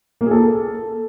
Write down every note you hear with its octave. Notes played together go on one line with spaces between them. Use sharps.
A#3
G#4
A4